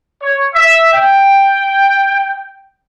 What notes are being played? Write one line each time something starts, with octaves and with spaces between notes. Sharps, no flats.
C#5
E5
G5